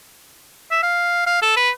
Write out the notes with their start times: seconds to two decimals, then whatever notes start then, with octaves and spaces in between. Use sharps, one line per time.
0.71 E5
0.83 F5
1.27 F5
1.42 A4
1.57 B4